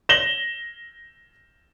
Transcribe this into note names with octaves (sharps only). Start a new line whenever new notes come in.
A#6 E7 F#7 G7